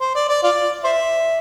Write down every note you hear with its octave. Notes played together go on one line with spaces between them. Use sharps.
C5
D5
D5
F4 D5
C5 E5